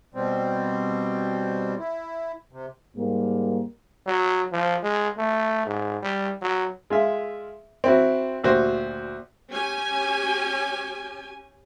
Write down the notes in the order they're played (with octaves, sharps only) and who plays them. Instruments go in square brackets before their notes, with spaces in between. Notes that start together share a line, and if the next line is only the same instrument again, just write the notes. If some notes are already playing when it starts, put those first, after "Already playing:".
[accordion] B2 G3 C4
E4
C3
[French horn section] G#2 G3 A#3
[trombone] F#3
F3
G#3
A3
G#2
G3
F#3
[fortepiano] G#3 F4 E5
C4 E4 F#4
D2 A#2 F#4 G4 C5
[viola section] C#4 G4 G#5